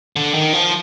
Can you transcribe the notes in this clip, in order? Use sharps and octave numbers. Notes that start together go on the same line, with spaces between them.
D3
D#3
F3